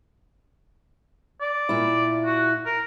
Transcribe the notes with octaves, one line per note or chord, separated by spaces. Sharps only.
D5
A#2 E4
F#4
A#4